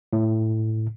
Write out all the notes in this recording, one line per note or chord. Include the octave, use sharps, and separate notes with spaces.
A2